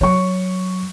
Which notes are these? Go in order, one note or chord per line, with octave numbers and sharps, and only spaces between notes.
F#3 C#5 C#6